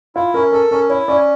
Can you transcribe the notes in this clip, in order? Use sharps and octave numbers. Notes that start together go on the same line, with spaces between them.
E4 F4
C#4 A#4
A4 A#4
C#4 A#4
E4 C#5
C#4 D5